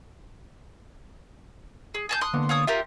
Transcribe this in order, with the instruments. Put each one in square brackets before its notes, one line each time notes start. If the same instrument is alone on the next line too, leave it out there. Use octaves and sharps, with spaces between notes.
[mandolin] G#4
G#4 A5 G6
C6 D#6 F#6
[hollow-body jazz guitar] D3 A#3 B3
[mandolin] F4 C#5 D#6
[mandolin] F4 G4 A#4 [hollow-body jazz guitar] E5